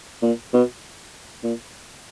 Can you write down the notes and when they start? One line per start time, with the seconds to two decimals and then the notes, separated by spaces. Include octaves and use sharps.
0.22 A#2
0.53 B2
1.44 A#2